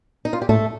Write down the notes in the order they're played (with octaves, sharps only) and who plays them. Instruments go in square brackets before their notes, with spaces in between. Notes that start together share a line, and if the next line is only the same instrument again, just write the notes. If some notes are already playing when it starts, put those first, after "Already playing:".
[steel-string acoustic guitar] D#4
F4
G4
[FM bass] A2 [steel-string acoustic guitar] A3 A4